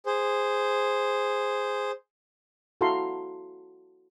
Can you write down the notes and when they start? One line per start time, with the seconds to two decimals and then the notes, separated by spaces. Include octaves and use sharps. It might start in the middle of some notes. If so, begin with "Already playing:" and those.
0.06 G#4 C5
2.81 E4 F#4 A4 F5 A#5 C6